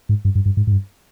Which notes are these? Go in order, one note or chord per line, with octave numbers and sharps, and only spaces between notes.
G#2
G2
G2
G2
G#2
G#2
G2